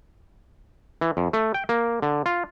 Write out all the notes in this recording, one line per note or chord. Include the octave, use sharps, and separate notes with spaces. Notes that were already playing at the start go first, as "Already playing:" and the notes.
E3
F2
A3
G5
A#3
D3
F4